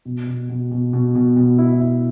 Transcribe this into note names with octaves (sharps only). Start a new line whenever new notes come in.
B2
B2
B2
B2
B2
B2
B2
E4
E4